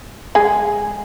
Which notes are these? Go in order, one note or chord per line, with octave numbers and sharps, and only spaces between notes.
G#3 G#4